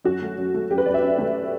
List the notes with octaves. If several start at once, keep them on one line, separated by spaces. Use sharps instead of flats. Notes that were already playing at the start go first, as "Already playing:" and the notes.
F#2 F#4
A3
F#2
A3
F#2 G4
B4
F#2 D5
E5
C#4
A3